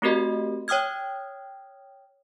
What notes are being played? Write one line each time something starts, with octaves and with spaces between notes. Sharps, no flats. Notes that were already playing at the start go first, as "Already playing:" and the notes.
A3 C4 F#4 G4 A#4 D#5
C#5 G5 D#6 F6 G#6